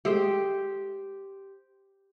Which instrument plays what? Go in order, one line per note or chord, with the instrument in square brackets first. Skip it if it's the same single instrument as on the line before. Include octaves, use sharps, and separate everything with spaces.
[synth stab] G#3 A3 [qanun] G4 C5 G5